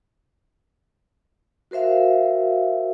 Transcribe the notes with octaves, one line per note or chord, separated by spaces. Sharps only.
F#4 A#4 C5 E5 F5